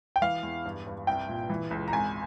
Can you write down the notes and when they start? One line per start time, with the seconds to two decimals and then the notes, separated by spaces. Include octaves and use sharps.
0.16 G5
0.22 E3 F5
0.43 E2
0.65 G2
0.87 G2
1.07 C2 G5
1.29 A#2
1.50 E3
1.71 C#2
1.88 A#5
1.92 G#1 G#5